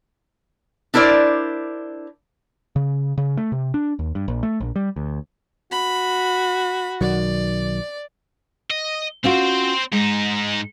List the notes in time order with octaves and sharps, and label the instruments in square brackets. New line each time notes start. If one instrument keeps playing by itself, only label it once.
[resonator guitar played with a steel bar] D4 E4 A#4 C5 D5
[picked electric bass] C#3
C#3
A3
C3
D4
D#2
G2
A#1
A3
A#1
G3
D2
[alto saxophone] F#4 [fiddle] B5
[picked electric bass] B1 D#3 F#3 [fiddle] D5
[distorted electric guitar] D#5
[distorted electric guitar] C4 C5 [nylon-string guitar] C#4 F4 F#4
[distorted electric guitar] G#2 D#4 [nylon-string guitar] G#3